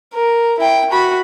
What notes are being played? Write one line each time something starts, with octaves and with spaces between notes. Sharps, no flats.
A#4
E4 G5
F#4 B5